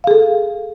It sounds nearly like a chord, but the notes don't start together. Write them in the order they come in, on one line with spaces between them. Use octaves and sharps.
F5 G#4 A4